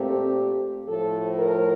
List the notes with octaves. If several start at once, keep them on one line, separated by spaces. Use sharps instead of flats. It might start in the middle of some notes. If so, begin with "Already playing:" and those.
Already playing: A#2 A3 C4 G4
A2 F3 A3 A4
A#4